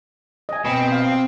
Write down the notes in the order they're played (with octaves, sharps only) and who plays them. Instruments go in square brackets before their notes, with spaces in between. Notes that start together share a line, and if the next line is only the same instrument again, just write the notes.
[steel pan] D#5 G#5
[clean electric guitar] B2 [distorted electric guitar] C4
[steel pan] F5